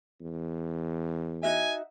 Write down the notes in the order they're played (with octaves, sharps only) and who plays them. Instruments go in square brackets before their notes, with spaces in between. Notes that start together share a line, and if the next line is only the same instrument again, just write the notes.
[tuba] E2
[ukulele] D#4 F#4 E5 [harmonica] G#5